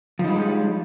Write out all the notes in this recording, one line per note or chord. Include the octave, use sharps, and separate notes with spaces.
F3 G3 G#3 D#4